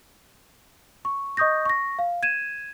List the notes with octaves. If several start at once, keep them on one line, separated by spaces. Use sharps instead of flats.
C#6
D#5 C#6 D#6 G6 A#6
C#6 A#6
F5
G#6 D#7 E7